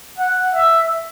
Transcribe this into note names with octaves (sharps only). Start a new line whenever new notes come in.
F#5
E5